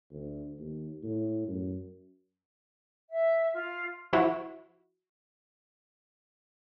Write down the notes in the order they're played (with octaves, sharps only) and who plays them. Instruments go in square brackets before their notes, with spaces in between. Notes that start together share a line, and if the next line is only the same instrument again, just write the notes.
[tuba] D2
D#2
A2
F#2
[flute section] E5
F4
[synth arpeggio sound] F3 E4 F#4